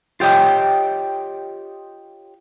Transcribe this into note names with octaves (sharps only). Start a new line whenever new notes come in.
F4 G4 C#5 D#5 G5